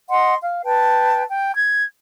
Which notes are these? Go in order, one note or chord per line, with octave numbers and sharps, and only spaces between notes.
D#5 F#5 C6
F5
B4 G5 A5
G5
G#6